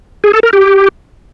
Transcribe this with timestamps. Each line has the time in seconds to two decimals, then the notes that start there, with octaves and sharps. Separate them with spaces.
0.24 G#4
0.33 A4
0.43 A#4
0.53 G4